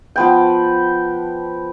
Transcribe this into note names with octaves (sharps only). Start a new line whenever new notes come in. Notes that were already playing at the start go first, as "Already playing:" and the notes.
F3 B3 G5